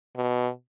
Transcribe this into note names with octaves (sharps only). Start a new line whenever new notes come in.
B2